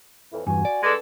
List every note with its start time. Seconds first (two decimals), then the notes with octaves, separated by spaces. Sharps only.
0.32 F2 A2 E3
0.47 E2 G2 F#4 G#5
0.65 D5
0.83 G2 G#3 D4 A4